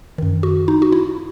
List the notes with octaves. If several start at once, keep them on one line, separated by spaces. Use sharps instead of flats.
F#2 D#3
F#4
D#4
F#4
E4